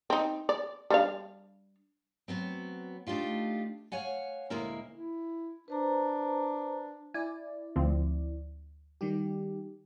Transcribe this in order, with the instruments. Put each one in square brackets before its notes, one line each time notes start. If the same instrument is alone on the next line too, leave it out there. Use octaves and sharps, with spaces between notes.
[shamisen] C4 D#4
D5
G3 D4 F5
[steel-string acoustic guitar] F#3 B3 C4
A3 D4 D#4 F4 G4
C#5 F5 F#5 G#5
D2 A#2 G#3 A#3 E4 A#4
[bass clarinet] E4
[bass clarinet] D4 [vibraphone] B4 C5 A#5
[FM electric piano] E4 D5 [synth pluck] G#5
[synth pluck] D2 F3 C4
[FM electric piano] D#3 G3 G4